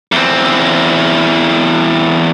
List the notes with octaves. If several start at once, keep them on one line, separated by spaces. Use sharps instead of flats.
E2 C4